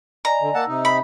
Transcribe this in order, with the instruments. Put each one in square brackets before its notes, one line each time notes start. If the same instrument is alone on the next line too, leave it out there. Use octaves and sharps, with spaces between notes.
[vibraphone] D5 D#5 G#5 [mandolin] A#5
[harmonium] D3
[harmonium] A#3 F#5 A5 [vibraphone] E6
[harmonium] C3 D#4
[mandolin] B5